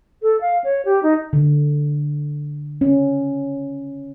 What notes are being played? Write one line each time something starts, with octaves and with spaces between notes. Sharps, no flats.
A4
F5
C#5
G4
D#4
D3
C#4